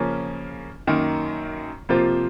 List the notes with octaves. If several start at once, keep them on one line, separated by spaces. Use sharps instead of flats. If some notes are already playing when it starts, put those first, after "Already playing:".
Already playing: C#3 F3 A#3 C#4
F#2 D#3 A#3
C3 F3 A#3 F4 C5